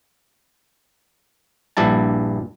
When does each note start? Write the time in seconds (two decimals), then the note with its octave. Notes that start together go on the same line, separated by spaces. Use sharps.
1.77 A#1 G2 G3 E4 A5